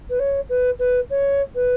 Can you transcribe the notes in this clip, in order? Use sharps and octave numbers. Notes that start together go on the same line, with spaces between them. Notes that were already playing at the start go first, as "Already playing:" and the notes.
B4
C#5
B4
B4
C#5
B4